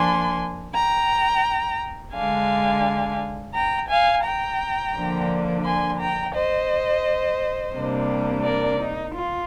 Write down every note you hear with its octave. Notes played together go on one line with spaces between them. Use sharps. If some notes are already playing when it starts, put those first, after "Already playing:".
Already playing: F3 A#3 D4 G#5 C6
G5 A#5
D3 G#3 D4 F5 G#5
G5 A#5
F5 G#5
G5 A#5
D3 F3 A#3 D4
G#5 C6
G5 A#5
C5 D#5
C3 G3 A#3 D4
A#4 D5
D#4
F4